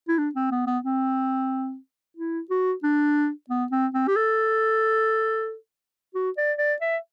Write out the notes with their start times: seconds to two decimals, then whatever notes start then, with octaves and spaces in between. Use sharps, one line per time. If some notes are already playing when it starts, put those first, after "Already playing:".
0.08 E4
0.18 D4
0.35 C4
0.51 B3
0.67 B3
0.84 C4
2.16 E4
2.50 F#4
2.83 D4
3.49 B3
3.71 C4
3.94 C4
4.07 G4
4.16 A4
6.15 F#4
6.37 D5
6.58 D5
6.81 E5